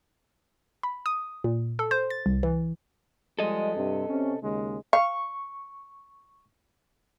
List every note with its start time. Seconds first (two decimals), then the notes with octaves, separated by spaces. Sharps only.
0.83 B5
1.06 D#6
1.44 A#2
1.79 A4
1.91 C5
2.10 A6
2.26 C2
2.43 E3
3.39 F3 G3 G#3 A4 D#5
3.75 G2 C3
4.08 C3 C#4
4.41 D#2 C#3 G#3
4.93 F5 C#6